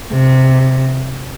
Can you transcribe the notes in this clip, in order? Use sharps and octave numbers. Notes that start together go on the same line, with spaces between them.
C3